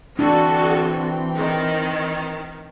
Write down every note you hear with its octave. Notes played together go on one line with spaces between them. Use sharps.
D3 E3 C4 D4 F#4 A4
D#3